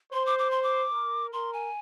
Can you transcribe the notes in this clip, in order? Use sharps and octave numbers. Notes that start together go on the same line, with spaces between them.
C5 C6
D6
D6
C6
D6
A#4
A#4 C6
G#5